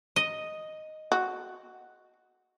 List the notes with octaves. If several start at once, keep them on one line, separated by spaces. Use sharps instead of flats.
D#5
F#4